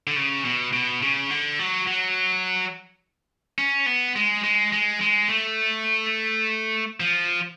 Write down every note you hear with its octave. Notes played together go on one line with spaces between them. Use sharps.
D3
C#3
B2
B2
C#3
D3
F#3
F#3
C#4
B3
G#3
G#3
G#3
G#3
A3
F3